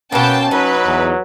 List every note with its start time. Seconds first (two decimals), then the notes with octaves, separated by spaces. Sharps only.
0.12 B2 A#3 B3 C#4 G5 A5
0.51 F#3 D#4 B4
0.86 E2